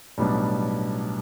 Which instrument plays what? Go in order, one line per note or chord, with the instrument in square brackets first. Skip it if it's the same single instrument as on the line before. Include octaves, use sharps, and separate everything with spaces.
[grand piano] B1 A2 G3 B3 D4